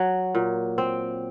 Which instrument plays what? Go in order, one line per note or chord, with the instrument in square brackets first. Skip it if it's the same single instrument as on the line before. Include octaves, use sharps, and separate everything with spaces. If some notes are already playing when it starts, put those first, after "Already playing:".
Already playing: [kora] F#3
A#2
C4